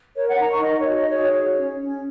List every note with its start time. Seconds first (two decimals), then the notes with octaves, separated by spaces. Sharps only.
0.16 A#4 C#5
0.28 F#5
0.39 D#4 A#5
0.51 C#6
0.63 D#4 D#5
0.79 C#5
0.87 F#4
0.95 D#5
1.10 G#4 C#5
1.33 C#5
1.57 C#4
1.80 C#4